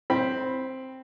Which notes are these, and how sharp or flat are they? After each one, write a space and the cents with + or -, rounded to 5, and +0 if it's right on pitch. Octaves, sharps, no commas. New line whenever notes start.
C4 +0 B5 +0